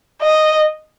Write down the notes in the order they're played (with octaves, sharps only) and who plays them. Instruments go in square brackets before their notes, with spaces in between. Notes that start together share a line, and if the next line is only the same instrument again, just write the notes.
[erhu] D#5